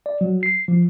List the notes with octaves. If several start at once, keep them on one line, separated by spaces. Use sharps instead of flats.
D5
F#3
C7
F3